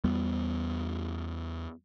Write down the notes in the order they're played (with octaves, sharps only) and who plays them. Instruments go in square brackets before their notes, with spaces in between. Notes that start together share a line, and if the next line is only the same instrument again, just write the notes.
[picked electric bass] E2 G3 B3